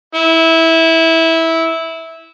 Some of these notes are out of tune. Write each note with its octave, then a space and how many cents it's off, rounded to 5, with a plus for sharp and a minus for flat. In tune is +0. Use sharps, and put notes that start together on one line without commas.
E4 -15